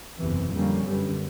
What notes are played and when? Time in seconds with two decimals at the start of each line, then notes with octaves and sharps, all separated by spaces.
0.19 F#1 E2 C3 E3
0.52 F2 D3 G3 A#3 C#4
0.85 F#2 D3 G3 B3